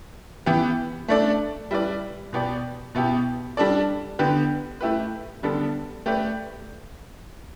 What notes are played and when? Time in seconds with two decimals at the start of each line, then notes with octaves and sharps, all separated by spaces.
0.46 E3 B3 G4
1.08 A3 D4 A4 D5
1.71 G3 E4 B4 D5
2.33 B2 B3 G4 D5
2.95 B2 B3 E4 G4
3.57 G3 D4 A4 D5
4.19 D3 B3 G4 B4
4.81 A3 E4 G4 B4
5.43 D3 G3 B3 D4 A4
6.06 A3 G4 B4 D5